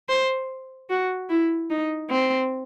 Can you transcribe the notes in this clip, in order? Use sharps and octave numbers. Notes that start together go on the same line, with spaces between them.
C5
F#4
E4
D#4
C4